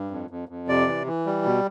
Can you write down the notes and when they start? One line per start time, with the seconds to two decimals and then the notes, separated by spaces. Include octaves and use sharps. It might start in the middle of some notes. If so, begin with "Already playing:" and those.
Already playing: G2
0.11 F2
0.30 F2
0.49 F2
0.68 C3 D5
0.88 E3
1.06 E3
1.26 G3
1.45 B2